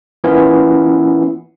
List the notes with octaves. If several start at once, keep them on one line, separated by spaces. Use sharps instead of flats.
E3 A#3 B3 C#4 E4 F4